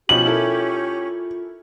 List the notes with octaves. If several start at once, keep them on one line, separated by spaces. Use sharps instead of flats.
B2 F3 C#4 D#4 F4 G4 F#7
E4 A4 A#4